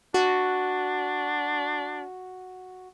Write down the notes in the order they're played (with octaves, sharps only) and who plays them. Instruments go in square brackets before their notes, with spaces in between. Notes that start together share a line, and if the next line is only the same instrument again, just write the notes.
[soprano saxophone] D4 [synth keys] F#4